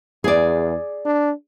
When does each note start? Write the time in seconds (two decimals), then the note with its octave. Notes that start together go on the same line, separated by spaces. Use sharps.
0.24 E2 G#4 D5
1.06 D4